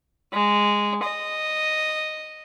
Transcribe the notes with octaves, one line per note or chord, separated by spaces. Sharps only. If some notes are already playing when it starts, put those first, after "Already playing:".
G#3
D#5